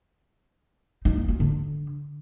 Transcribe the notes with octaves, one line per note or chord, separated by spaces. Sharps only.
D#4
A#3
F4
D3